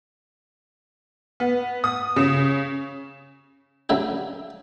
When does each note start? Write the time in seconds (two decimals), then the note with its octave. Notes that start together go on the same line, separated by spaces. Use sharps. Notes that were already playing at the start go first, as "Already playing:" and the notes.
1.40 B3
1.84 D#6
2.16 C#3
3.89 C#3 F#3 A3 D4 G4